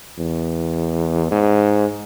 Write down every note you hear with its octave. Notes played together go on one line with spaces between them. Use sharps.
E2
G#2